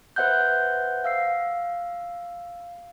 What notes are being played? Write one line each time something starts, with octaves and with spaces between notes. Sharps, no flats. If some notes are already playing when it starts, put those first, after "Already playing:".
B4 C5 E5 F#5 F#6 G6
F5 E6 C7